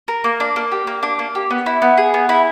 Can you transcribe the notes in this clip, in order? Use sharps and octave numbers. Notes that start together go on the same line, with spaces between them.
A#4
A#3
D4
A#3
G4
A#3
D4
A#3
G4
B3
E4
B3
G#4
B3
E4